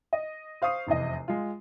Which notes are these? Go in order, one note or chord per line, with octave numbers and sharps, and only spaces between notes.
D#5
C5 F5 C#6 D#6 C7
F1 E2 C3 D#5
G#3 F4